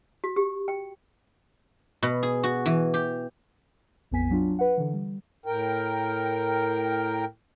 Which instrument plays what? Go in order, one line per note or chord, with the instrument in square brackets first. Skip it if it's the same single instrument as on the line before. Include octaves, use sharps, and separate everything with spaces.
[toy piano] F#4
G4
G5
[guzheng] B2
G#4
F#4
E3
G4
[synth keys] A#1 F2 B3 G#5 B6
F#3 D4 F4
B4 F#5
D3 E3
G3
[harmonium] A2 A#4 G5